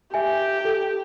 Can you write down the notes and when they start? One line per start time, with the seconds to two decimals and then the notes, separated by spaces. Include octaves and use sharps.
0.14 G4 E5 G#5
0.65 A4